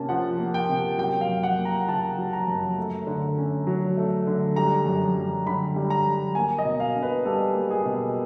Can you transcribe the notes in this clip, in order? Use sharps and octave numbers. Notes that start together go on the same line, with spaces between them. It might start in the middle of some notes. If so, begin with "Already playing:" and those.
Already playing: C3 A#3 C#4 A5
F3 F#5
A#3
G5
C3
F#3 G5
F5
F#2
F#5
A#3
A#5
C#3 A5
F#3
A#5
F#2
A3
D3
C#4
F#3
A3
D3
G3 A#5
F#2
F#2
D3 B5
G3
A#5
F#2
A#3 G#5
D#5
B2
F5
D4
B4
G3 A4
A#3
G#4
B2